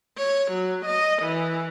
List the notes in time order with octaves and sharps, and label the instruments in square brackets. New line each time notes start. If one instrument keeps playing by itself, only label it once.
[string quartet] C#5
F#3
D#5
E3